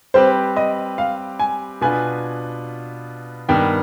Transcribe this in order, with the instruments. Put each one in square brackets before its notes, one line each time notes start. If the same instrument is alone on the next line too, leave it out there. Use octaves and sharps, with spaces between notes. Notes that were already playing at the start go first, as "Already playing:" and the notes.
[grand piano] G3 C4 G4 B4 [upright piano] C5
[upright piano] D#5
F5
G#5
[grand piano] B2 B3 D4 F4 B4 [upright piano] G#5
[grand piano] G2 D#3 B3 [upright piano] G5